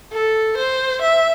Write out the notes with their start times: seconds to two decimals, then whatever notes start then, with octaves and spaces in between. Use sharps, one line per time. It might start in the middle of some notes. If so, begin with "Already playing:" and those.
0.13 A4
0.57 C5
1.01 E5